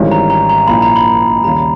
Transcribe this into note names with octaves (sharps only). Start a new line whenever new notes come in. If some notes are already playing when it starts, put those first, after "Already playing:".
Already playing: G#1 G#2 E3 G3 C#4
A#5
A#5
A#5
A#1 A#2 A#3 C#4 E4 B5
A#5
B5
D#2 C#3 G3 A#5